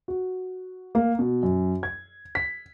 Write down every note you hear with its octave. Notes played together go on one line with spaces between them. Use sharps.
F#4
A#3
B2
F#2
G#6
B6